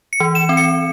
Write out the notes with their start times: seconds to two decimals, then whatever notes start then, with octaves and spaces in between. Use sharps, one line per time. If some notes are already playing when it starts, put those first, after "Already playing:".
0.13 C#7
0.20 E3
0.35 E7
0.49 C4
0.57 C#7